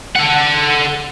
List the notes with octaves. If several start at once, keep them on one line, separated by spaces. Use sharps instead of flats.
A4 F#5